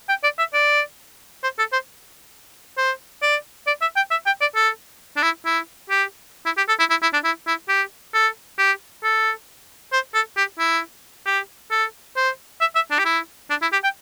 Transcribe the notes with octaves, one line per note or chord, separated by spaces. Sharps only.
G5
D5
E5
D5
C5
A4
C5
C5
D5
D5
E5
G5
E5
G5
D5
A4
D4
E4
E4
G4
E4
G4
A4
E4
E4
E4
D4
E4
E4
G4
A4
G4
A4
C5
A4
G4
E4
G4
A4
C5
E5
E5
D4
G4
E4
D4
E4
G4
G5